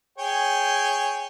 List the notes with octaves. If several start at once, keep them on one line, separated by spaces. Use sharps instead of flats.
G#4 C#5 G5